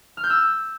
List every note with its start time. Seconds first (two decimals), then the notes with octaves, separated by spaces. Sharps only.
0.17 F6
0.24 G6
0.30 E6